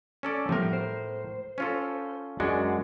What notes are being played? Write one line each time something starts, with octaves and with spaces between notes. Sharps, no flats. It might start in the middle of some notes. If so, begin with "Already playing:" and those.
C#4 A4 D5
A2 F3 G3 B3 A#4
C5
C#4 F4 A4
F#2 G#3 D4 F#4